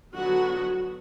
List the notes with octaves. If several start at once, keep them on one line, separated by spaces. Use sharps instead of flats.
D3 F#3 B3 F#4